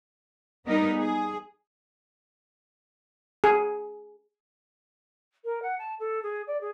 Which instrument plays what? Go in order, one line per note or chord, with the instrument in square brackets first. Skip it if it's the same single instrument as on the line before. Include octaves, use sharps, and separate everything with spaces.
[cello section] G3 B3 D#4 A#4
G#4
[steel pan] G#4
[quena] A#4
F#5
A5
A4
G#4
D5
G#4